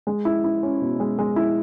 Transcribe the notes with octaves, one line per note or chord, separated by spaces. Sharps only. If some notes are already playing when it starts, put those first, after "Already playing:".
G#3
E4
E4
C#4
B2
G#3
G#3
E4